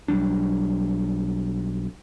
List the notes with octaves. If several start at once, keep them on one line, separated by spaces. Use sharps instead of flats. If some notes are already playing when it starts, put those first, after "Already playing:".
B1 F#3 G3 D4